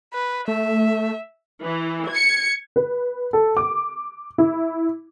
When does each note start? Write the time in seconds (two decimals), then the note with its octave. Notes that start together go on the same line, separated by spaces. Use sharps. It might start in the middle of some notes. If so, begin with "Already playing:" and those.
0.14 B4
0.48 A3 E5
1.64 E3
2.11 G#6 C#7
2.76 B4
3.33 A4
3.57 D6
4.38 E4